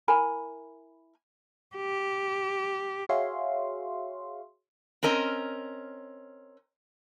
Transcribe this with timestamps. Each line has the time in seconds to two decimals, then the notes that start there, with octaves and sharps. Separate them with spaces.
0.08 E4 A#4 G#5 B5
1.76 G4
3.09 F#4 G#4 C#5 E5 F5 C6
5.03 C4 C#4 A#4 D#5